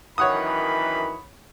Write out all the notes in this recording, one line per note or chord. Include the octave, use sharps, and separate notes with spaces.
F#2 D#3 E3 C#5 F#5 B5 D#6